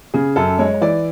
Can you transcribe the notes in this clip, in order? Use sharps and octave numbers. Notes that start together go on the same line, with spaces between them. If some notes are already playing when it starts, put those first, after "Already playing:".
C#3 G#4
F#2 A4
G#3 C#5
C#5
E3 D5